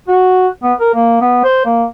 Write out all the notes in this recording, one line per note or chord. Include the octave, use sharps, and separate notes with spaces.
F#4
B3
A#4
A#3
B3
C5
A#3